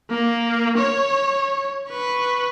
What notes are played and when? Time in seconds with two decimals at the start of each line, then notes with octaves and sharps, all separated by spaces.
0.10 A#3
0.78 C#5
1.89 B4 C#6